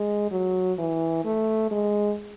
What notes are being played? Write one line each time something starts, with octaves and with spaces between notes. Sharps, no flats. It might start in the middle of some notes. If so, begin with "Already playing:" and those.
Already playing: G#3
F#3
E3
A3
G#3